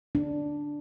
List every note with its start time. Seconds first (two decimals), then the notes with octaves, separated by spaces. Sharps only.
0.15 D4